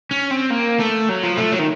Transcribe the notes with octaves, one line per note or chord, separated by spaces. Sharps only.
C#4
C4
A#3
A3
F#3
F3
A3
F#3
D#3